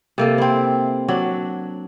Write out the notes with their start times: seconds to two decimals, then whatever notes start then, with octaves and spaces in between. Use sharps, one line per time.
0.18 C3 A#3 A4
0.38 C4 E4
1.08 F#3 D4